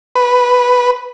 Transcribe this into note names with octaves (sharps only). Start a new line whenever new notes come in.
B4